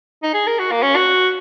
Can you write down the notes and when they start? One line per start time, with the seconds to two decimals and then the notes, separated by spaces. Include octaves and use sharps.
0.23 D#4
0.34 G#4
0.47 A#4
0.59 F#4
0.72 A#3
0.83 C#4
0.96 F#4